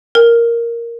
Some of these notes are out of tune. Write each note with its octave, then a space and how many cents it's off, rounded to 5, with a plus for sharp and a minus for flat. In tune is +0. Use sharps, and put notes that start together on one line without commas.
A#4 +0